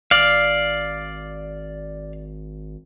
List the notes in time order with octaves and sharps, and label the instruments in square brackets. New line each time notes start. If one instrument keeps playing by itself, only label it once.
[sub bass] G#1 [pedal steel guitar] D5 F5